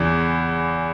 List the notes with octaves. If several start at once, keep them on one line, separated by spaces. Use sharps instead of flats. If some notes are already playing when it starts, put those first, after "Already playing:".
Already playing: E2 C#3 E3